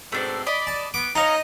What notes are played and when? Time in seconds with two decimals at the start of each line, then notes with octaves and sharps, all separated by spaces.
0.12 G#2 B2 A3 C4 D4
0.47 D5 D#5 B5
0.67 A5
0.94 B3 D6
1.15 D#4 C#5 D#5 F5 A#5